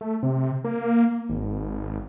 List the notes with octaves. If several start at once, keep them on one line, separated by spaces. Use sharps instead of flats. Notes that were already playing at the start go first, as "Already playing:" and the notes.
A3
C3
A#3
G#1